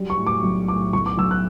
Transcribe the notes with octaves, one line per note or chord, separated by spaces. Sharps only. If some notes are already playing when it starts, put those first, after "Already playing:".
Already playing: F#3 G3
C#6
A2
D6
B1
A2 D6
B1 C#6
D6
B1 E6
F#6